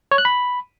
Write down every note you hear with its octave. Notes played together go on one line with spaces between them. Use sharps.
C#5
F#6
B5